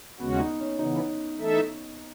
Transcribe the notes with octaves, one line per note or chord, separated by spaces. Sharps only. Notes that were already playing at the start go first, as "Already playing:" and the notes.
D#2 C#3 G#3 B3 C#4 F#4
D#4
C#4
C#3 E3 B3 D#4
E3 A3 D#4 A4 E5